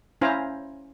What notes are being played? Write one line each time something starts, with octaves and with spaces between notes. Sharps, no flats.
C#4 E4 C5 F5 G#5 A#5